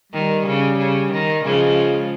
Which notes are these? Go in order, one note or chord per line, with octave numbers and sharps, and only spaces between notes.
D#3 G3
C#3
C#3
D#3
C#3 F3 G#3